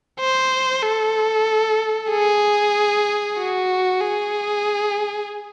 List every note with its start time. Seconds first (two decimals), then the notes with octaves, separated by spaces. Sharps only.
0.20 C5
0.83 A4
2.11 G#4
3.38 F#4
4.01 G#4